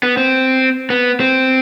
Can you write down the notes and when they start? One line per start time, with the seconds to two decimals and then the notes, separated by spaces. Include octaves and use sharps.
0.03 B3
0.17 C4
0.90 B3
1.20 C4